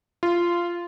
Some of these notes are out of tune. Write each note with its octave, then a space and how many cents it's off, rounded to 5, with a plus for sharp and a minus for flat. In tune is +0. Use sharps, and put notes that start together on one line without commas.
F4 -15